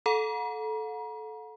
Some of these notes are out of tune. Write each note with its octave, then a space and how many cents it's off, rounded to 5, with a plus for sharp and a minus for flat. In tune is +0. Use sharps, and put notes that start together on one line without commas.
A4 -15 F#5 -40 A#5 +40